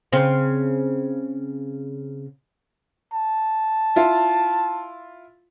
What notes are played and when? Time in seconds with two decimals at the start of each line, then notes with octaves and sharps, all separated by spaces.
0.12 C#3 C4
3.13 A5
3.96 E4 F4